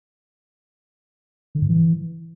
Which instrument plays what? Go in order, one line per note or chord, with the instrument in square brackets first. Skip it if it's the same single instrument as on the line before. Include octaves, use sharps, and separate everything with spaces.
[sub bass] D3
G#2
E3